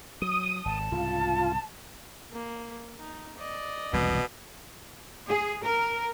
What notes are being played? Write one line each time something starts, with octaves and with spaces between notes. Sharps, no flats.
F#3 D#6
G#1 A5
C2 G#2 C#3 F4
A#3
D#4
D5 D#5
E1 C2 F2 B2
G#4
A#4